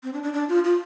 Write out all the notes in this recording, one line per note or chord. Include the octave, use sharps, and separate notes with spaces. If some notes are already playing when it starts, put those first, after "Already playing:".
C4
D4
D4
D4
F4
F4